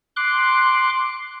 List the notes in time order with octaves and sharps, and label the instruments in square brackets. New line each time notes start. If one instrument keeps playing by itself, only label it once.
[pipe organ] C6 D6 F#6